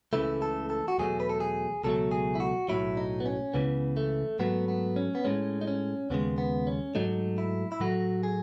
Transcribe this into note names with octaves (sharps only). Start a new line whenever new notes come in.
C#2 C#3 E3 A3 E4
A4
A4
F#4
E2 B2 F#3 A3 G#4
B4
A4
G#4
C#2 B2 F#3 A3 A4
G#4
E4
F#4
B1 A2 F#3 E4
D#4
B3
C#4
C#2 C#3 E3 B3
A3
G#2 F#3 A3 B3
B3
C#4
B3
A2 G#3 C#4
D#4
C#4
D#2 C#3 G#3 B3
B3
C#4
G#2 F#3 A3 D#4
E4
E4
A2 F#3 A3 F#4
G#4